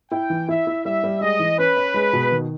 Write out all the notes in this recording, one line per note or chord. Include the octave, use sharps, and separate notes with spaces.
E4 G5
E3
E4 E5
E4
G3 E5
G3
G#3 D#5
E3
C#4 B4
C#4
G#3
B2
D#3